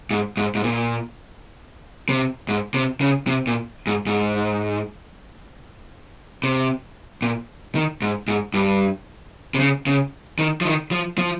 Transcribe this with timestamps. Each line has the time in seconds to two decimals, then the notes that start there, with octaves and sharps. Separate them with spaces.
0.11 G#2
0.37 G#2
0.55 G#2
0.64 A#2
2.09 C3
2.48 G#2
2.74 C3
3.01 C#3
3.27 C3
3.47 A#2
3.87 G#2
4.06 G#2
6.44 C3
7.22 A#2
7.75 D#3
8.02 G#2
8.28 G#2
8.54 G2
9.54 C3
9.60 C#3
9.87 C#3
10.39 D#3
10.61 F3
10.65 D#3
10.91 F3
11.18 F3